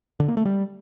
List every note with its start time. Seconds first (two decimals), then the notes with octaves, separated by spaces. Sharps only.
0.20 D3
0.28 A#3
0.37 A3
0.45 G3